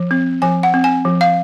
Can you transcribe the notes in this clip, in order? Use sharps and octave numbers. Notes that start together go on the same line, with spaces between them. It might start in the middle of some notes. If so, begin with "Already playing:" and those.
Already playing: F3
C4
F3 G#5
F#5
C4
G#5
F3
F5